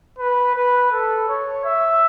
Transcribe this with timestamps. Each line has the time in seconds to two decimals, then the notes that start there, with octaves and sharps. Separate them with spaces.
0.18 B4
0.55 B4
0.92 A4
1.29 C#5
1.65 E5